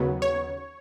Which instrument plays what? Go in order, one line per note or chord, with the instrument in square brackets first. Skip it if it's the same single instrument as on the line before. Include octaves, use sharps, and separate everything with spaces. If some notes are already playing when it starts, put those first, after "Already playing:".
Already playing: [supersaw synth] D#2 C#3 F#3 B3
C#5